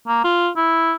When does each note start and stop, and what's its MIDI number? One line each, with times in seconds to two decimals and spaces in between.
0.07 0.21 58
0.24 0.49 65
0.56 0.94 64